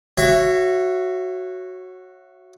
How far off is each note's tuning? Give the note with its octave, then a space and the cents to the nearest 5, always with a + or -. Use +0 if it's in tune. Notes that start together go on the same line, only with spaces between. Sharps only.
F#4 +0 C#5 -20 E5 +25